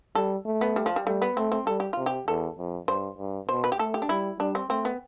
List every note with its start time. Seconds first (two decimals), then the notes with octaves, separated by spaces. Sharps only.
0.15 G3 A4
0.45 A3
0.61 B3
0.76 G3
0.86 F3
0.96 G3
1.06 G3 A3
1.22 B3
1.37 A3 C4
1.52 C4
1.67 G3 A4
1.80 G4
1.93 C3 F4
2.06 G4
2.27 E2 A4
2.58 F2
2.88 G2 C5
3.18 G2
3.49 B2 C5
3.64 B4
3.72 G4
3.79 A3 A4
3.94 G4
4.02 D4
4.09 G3 E4
4.39 G3 D4
4.55 C4
4.70 A3 C4
4.85 B3